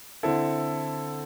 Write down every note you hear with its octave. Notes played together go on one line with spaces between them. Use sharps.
D3 C4 E4 A4